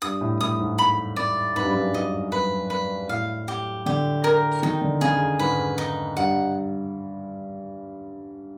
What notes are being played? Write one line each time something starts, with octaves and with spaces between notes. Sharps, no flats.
G2 D#6
A2
A2 D#6
G#2
B5
D5
G#2 B4
G2
F#2
G2
G#2 D#5
B4
B4
A2 F5
G4
D3 G4
A#4
D#3 D#4
D3
C#3 G#4
G#2 B4
D#4
G2 F#5